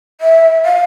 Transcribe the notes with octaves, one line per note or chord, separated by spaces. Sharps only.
E5
F5